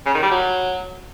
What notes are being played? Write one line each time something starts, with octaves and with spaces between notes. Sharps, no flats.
C#3
D#3
G3
F#3